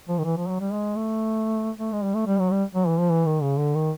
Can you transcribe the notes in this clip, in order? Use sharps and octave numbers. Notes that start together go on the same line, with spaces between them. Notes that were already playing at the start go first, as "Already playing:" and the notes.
F3
D#3
E3
F3
F#3
G3
G#3
A3
A3
G#3
G3
A3
G3
F#3
G3
F#3
E3
F3
E3
D#3
C#3
D3
D#3